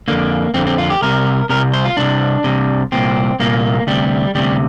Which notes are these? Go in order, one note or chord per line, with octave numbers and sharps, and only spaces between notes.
F2 D3 A#3
F2 D3 C4
C4
F4
G4
C2 C3 A#4
C2 C3 A#4
C5
F4
C2 C3 D4
C2 C3
C2 A#2 C4
C2 A#2 A#3
D2 C3 G3
D2 C3 G3